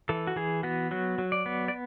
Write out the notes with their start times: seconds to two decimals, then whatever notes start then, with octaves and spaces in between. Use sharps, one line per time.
0.09 E3 A4
0.27 F#4
0.36 E3 G#4
0.63 B3 F#4
0.91 F#3 F#4
1.18 F#3
1.32 D5
1.46 B3
1.68 D5